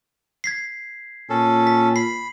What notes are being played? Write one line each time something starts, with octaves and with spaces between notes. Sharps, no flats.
G#6 B6 C7
A#2 C#4 A4
B6
B5 C7